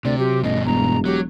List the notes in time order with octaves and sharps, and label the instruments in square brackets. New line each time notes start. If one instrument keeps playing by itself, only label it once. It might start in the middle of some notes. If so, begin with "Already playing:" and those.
[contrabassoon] D2 [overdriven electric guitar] C3 [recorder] D5
[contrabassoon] F#3 [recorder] G4
[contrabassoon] A1 [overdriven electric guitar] G2 B2 [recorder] D#5
[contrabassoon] E1 [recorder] A#5
[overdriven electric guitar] F#3 [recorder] G4